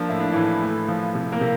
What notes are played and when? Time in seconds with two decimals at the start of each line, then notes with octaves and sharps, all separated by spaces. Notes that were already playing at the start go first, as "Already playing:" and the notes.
Already playing: F3 A#3 D4
0.09 A2 E4
0.20 D4
0.32 A2 E3 E4
0.62 A3
0.88 F3
1.15 C3
1.32 A#3 A#4
1.41 C3